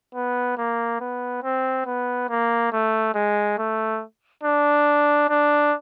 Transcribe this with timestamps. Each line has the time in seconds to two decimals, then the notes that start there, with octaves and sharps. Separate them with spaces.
0.15 B3
0.58 A#3
1.01 B3
1.43 C4
1.86 B3
2.29 A#3
2.72 A3
3.14 G#3
3.58 A3
4.44 D4
5.29 D4